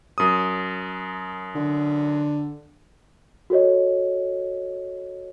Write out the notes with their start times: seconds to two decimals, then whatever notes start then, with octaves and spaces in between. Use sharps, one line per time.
0.18 F#2 D#6
1.55 D3
3.50 F#4 A4 C#5 D#5